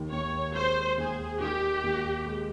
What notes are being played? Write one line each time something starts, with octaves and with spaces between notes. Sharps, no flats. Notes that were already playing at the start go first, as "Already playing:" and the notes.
Already playing: D#2 D#3
D#2 C#5
G#3 C5
D#2 G#4
D#3 G4
D#2
G#3